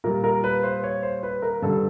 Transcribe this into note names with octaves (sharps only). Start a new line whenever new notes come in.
A#2 G3 A#4
A#4
B4
C5
C#5
C5
B4
A#4
G2 D3 G3 A4